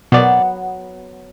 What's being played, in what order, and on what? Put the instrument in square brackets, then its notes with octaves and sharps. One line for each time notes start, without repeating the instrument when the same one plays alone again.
[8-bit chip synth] B2 D5 [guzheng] F#3 B3